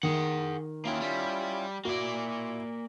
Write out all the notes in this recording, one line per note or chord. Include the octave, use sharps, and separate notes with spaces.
D#3 G#4 F#5
A#3 C#4 E4 F4 G5
G3
A#3 E4 F#4 D5